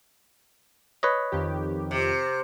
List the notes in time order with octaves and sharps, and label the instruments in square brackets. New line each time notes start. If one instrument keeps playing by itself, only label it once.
[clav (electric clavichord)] B4 C#5 D#5
[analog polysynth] F2 D#3 G4
[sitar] C3